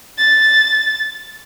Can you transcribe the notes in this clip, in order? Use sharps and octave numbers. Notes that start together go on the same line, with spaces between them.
A6